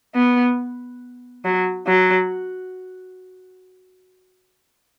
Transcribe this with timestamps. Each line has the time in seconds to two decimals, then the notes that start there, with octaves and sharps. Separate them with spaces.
0.14 B3
1.44 F#3
1.87 F#3